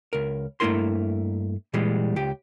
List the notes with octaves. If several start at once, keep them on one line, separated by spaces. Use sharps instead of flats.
C#2 A#4
G2 A3 A#3 E4 A#4 C6
A#2 E3 G3 G#3
C#2 G4